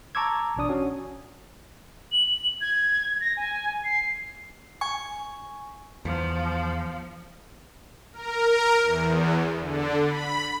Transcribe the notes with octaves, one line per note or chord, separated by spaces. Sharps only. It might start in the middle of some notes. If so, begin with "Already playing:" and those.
A5 A#5 C#6 D6 E6 G#6
A1 B2 D4 D#6
C#4 F#4
F#7
G#6
A#6
G#5
C7
G#5 C#6
E2 F3
A#4
E2
D3
B5